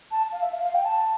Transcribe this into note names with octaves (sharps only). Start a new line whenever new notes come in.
A5
F5
E5
F5
F5
G5
A5